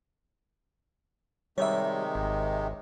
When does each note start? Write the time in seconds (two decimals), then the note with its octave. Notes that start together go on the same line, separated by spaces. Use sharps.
1.58 C3 D#3 G3 G#3 C#5 E5
2.15 G#1